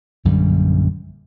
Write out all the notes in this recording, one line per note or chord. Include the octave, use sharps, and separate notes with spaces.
A#1 F#2 D3 G3